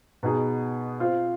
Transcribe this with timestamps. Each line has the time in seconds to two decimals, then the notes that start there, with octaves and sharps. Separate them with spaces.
0.23 B2 B3 D#4 G#4
0.99 C4 F4 C5